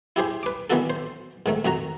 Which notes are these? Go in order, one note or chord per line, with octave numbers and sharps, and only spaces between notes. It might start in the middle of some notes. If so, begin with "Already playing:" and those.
E4 G4 G#4 C5
B4 D6
D#3 E3 B3 D4 F#4 A4
C5
G#2 D#3 A3
F2 D#3 F#4 A#5